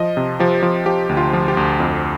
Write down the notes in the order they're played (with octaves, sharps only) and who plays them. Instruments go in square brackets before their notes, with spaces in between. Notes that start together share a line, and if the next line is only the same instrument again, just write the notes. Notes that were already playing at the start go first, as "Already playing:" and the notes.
Already playing: [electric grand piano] F3 D#5
C3
F3 G4
F3
F3 G4
D2
F4
F3
G4
D2
F2